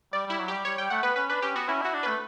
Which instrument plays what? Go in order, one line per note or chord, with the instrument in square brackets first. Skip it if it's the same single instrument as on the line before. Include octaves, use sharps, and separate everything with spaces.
[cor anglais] G3 [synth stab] D5
[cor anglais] G3 [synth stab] E4
[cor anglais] F#3
[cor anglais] G3 [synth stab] G4
[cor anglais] G3 [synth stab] C#5
[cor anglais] G3 [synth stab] G5
[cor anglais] A3 [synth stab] F#5
[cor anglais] B3 [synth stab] B4
[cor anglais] C#4 [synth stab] B4
[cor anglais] D4 [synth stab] B4
[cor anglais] C#4 [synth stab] G4
[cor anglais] B3 [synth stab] F#4
[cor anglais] C#4 [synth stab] E4
[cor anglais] E4 [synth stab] F#4
[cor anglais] D4
[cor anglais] A3 [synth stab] B4